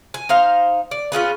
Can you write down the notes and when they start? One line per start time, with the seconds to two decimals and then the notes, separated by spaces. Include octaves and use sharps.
0.14 G#5
0.29 D#4 C5 F5
0.91 D5
1.12 C#4 F4 G#4 B4